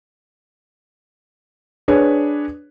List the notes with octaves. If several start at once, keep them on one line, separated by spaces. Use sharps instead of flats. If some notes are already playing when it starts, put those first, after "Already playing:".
D4 G#4 B4 C#5